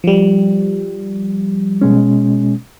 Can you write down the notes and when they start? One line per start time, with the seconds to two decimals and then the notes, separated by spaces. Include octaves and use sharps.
0.04 F3 G3
1.81 B2 G#3 C#4